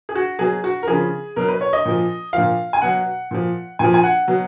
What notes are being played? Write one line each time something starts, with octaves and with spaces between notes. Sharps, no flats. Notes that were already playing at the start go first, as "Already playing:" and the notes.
G#4
F#4
B2 F#3 G#4
F#4
A#4
C#3 F3 G#4
B2 F#3 A#4
B4
C#5
D#5
A#2 F3
A#2 F3 F5
G#5
B2 F#3 F#5
A#2 F3
A#2 F3 G#5
G#5
F#5
B2 F#3